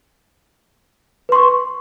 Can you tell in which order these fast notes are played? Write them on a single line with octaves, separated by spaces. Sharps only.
B4 C6 C#6